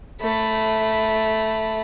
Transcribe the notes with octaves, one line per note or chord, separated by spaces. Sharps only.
A3 B5